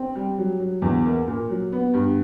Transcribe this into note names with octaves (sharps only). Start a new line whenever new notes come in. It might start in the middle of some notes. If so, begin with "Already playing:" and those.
Already playing: C4
G3
F#3
F#3
E2
A#3
A#2
F#3
B3
G2